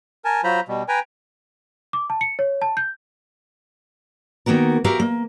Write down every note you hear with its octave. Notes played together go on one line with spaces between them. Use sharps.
A#4 G#5 A5
F#3 F4 C5 A#5 B5
B2 G3
B4 G5 G#5 A#5
D6
A5
C#7
C#5
A5
G6
D#3 A#3 B3 F#4 A#4
F#4 G4 A#4 E5 F5
A#3